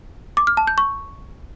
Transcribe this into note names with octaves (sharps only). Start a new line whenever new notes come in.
D6
F6
A5
G6
C#6